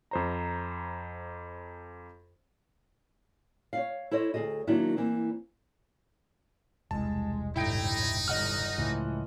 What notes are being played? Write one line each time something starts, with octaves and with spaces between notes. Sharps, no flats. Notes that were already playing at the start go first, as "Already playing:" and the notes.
F2 C5 A#5
C#5 D5 F5
E4 A4 C5 C#5 D#5
D2 G#2 G#4 A4 D#5
D#3 F#3 A#3 D4 E4
E3 A#3 C4
E1 C2 G#3 A5
G1 A2 D#4 E4 G5 D7
G1 E2 D#5 F#5 F6
C#2 A2 E3 F3